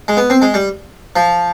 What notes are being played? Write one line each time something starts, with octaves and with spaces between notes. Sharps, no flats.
G#3
B3
C4
G#3
G3
F3